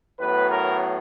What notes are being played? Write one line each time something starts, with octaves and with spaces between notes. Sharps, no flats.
A2 F#3 B3 B4
A#4